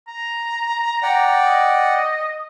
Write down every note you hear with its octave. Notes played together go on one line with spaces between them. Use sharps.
A#5
D5 F#5 G5
D#5